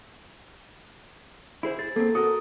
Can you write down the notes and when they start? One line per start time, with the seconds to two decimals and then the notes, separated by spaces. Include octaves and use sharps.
1.63 E4 G#4 C5
1.79 G#4 A6
1.96 A#3 C4 A4
2.15 F#4 A4 A#4 D#6